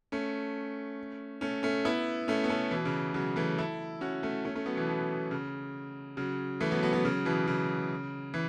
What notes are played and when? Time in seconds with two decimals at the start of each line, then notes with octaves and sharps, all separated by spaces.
0.12 A3 C#4
1.41 A3 C#4
1.63 A3 C#4
1.85 B3 E4
2.28 A3 C#4
2.44 B3
2.49 A3 C#4
2.71 B2 E3
2.85 C#3
3.14 C#3 F#3
3.36 E3 A3
3.58 E4 A4
4.01 C#4 F#4
4.23 A3 C#4
4.45 A3 C#4
4.55 A3 C#4
4.66 F#3 B3
4.77 B2 E3
4.88 B2
5.31 C#3
6.17 C#3 F#3
6.60 E3 A3
6.71 F#3 B3
6.83 F#3 B3
6.93 F#3 B3
7.05 C#3 F#3
7.25 B2 E3
7.48 C#3
8.34 E3